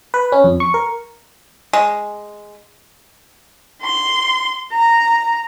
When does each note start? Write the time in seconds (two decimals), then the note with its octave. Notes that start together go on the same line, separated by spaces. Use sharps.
0.14 B4
0.32 C#4
0.44 F2
0.60 C#6
0.74 A#4
1.73 G#3
3.82 C6
4.72 A#5